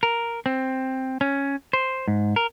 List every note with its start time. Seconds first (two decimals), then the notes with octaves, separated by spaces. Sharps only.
0.03 A#4
0.46 C4
1.21 C#4
1.73 C5
2.08 G#2
2.36 A#4